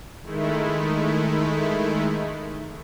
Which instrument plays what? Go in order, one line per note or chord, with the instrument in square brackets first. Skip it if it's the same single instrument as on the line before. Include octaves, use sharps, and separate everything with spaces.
[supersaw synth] D#3 G#3 A3 E4